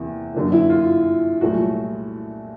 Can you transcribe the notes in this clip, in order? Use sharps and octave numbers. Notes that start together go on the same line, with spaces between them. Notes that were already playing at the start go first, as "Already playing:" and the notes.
Already playing: E2 C3 A#3 E4
F#2 D3 F#3 A#3
E4
F4
C2 A#2 F#3 A3 F#4